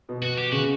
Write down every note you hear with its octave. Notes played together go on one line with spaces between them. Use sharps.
B2
F#4
G4
C#3 F#4